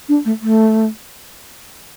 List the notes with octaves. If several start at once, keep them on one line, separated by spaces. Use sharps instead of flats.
D4
A3
A3